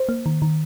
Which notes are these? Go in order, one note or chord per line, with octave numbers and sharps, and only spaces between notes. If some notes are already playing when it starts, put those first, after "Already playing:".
Already playing: C5
A#3
D#3
D#3